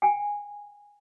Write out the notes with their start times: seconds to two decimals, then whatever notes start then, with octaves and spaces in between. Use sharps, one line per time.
0.02 G5 G#5